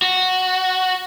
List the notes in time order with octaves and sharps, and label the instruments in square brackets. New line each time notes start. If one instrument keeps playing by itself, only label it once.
[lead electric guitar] F#4